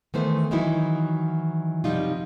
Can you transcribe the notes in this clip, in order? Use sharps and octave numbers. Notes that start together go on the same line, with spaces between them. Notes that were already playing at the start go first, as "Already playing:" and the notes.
D#3 E3 A3 B3 C5
D#3 E3 F#3 D#4 E4
F#2 C3 F3 G3 D#4 F4